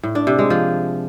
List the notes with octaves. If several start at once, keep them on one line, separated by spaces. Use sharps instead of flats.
A2
D4
C3
G#3
F3